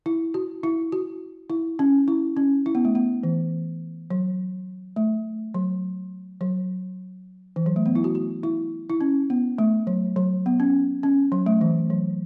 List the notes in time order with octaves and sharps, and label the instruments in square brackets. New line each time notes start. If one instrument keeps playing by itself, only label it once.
[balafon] E4
F#4
E4
F#4
E4
C#4
E4
C#4
E4
B3
A3
B3
E3
F#3
A3
F#3
F#3
E3
F#3
A3
B3
E4
F#4
F#4
E4
E4
C#4
B3
A3
F#3
F#3
B3
C#4
C#4
F#3
A3
E3
F#3